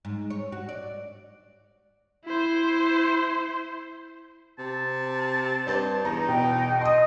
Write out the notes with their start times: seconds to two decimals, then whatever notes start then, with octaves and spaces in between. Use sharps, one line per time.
0.05 G#2
0.30 C#5
0.52 F#4
0.69 D5
2.25 E4 C5
4.59 C3 A5
5.67 G2 C5
6.05 E2 D#4 A#5
6.29 B2 G5
6.81 D#5 C6 D#6